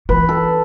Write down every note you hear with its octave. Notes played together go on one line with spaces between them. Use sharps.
E3 B4
A4